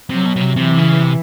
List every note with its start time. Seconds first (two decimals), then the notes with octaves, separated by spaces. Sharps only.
0.10 C3 F#3
0.26 B2
0.36 B2
0.41 C3
0.55 C3 E3
0.78 C#3
1.01 C3